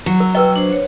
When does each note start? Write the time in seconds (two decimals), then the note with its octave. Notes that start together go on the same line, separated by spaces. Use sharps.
0.06 F#3
0.20 A#4
0.35 A#4 B4 D#5 G5 E6
0.56 D4 C5
0.73 C#5